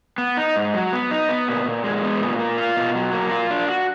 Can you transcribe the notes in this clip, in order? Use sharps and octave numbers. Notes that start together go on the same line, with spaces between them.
B3
D#4
G#2
F#3
B3
D#4
B3
A#2
A#2
G#3
B3
A#2
A#3
F4
B2
F#3
A#3
F4
D4
F#4